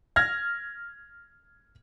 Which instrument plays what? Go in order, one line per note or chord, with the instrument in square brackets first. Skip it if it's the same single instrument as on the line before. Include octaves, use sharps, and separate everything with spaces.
[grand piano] F6 G#6 A#6